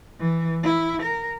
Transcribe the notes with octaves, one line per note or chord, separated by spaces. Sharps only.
E3
E4
A#4